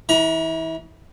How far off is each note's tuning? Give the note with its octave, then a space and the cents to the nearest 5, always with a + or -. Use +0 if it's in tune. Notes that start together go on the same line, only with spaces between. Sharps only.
E3 -30 A#5 +30